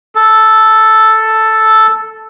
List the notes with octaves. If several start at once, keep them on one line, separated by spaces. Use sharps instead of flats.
A4